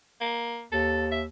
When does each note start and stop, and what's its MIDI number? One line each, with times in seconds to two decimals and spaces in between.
0.21 0.63 58
0.72 1.27 39
0.72 1.06 69
1.12 1.23 76